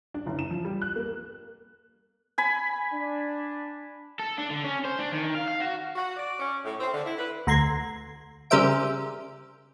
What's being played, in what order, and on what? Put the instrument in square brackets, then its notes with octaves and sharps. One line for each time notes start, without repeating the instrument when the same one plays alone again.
[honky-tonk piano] D4
F#1
E7
F3
G3
F#6
A#3
[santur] G#5 B5
[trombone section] D4
[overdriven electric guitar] A4
D4
D3
C#4
C5
D4
D#3
F5
F5
F#4
[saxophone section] F#4
D5
C#4
A2
C4
D3
E4
B4
[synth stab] D2 A#5 C6 G#6
C#3 G3 A#4 C5 E5 D7